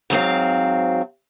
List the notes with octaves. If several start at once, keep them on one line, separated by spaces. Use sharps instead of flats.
G#2 F#3 C4 F5